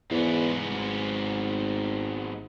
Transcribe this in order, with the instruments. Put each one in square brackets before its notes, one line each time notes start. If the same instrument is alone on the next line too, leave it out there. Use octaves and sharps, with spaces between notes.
[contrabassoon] E2 [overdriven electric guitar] G#2 B3
[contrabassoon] G#1